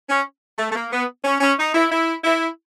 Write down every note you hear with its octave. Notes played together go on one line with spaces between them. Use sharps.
C#4
A3
A3
A#3
B3
C#4
C#4
D#4
E4
E4
E4